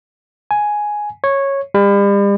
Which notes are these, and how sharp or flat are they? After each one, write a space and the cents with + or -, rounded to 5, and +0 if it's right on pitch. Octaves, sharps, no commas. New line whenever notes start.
G#5 +5
C#5 -10
G3 +40